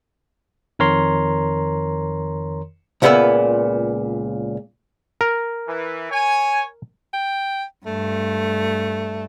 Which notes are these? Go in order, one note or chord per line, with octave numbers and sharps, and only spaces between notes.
F2 D#3 A#4 C#5 A#5 C6
C#2 A#2 B3 E4 B4 E5
A#4
E3
C#5 G#5
G5
G2 A3